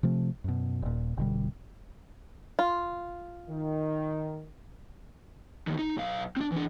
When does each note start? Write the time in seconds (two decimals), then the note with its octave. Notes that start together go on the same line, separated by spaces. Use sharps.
0.03 C3 F3 A3
0.44 F#2 B2
0.82 D#1 A#2
1.17 F1 B2 D3 G3
2.59 F4
3.48 D#3
5.67 E2 D#3
5.79 D#4
5.97 B1 F5
6.37 C4 D4
6.52 E3 D4